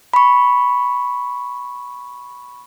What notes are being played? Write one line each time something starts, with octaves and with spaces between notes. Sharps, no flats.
B5 C#6